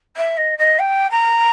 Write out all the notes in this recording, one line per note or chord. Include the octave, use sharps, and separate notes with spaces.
E5
D#5
D#5
G5
A#5